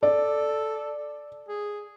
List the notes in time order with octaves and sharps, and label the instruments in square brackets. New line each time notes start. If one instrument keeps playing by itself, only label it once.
[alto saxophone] A4 [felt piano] D5
[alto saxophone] G#4